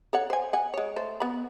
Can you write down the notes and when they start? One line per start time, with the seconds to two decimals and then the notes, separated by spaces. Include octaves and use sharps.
0.13 A4 C#5 F#5
0.30 C5 G#5
0.53 F#5 G#5
0.74 G#3 C#5
0.96 A3 A4 C5
1.20 B3 B5